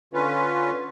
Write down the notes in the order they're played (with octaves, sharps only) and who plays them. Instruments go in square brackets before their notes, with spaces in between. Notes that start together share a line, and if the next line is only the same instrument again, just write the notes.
[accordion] D3 C#4 F4 B4